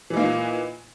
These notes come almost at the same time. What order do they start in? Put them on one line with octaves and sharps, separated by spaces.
E3 D#4 A#3 A#2